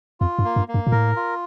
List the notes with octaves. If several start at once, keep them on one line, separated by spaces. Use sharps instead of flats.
F2 F4
G2
A#3
G2
A#3
G2
A#2
A2 A#4
F4